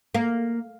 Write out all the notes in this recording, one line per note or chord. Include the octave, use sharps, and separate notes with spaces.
A#3